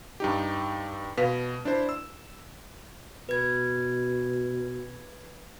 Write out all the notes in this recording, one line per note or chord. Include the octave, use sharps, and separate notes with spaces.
G2 D#4 G4
B2 B4 F5
D4 E4 C5
E6
B2 B4 G#6